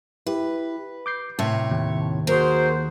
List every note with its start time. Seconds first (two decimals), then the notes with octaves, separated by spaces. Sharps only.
0.26 E4 G4 B4
1.06 D6 G6 C7
1.39 A2 C3 C#5 E5 A5
1.71 D#2
2.27 A#3 F#4 G#4 A#4 C5